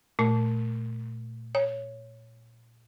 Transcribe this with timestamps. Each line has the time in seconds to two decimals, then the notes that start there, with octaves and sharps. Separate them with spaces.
0.19 A#2 A3
1.55 C#5